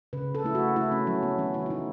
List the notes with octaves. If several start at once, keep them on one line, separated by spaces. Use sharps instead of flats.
C#3 B4
A4
A3 E4
F#4
A3 E4
C#4
F#3 C#4
B3
E3 C#4
E4
E4
A3 D#4